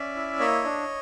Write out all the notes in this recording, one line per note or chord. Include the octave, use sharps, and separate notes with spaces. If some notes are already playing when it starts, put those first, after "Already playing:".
Already playing: C#4 D5 E5
E4
A#3 C#5 D#5
D4